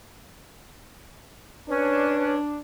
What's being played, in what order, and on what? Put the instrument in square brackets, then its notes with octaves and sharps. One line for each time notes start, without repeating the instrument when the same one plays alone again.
[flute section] C#4 C#5 [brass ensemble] D4 [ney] B4